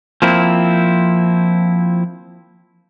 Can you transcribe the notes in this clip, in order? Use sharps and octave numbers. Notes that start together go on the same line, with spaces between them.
F3 A#3 C4 E4